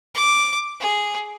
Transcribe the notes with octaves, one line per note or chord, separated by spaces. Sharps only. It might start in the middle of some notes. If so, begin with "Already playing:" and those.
D6
G#4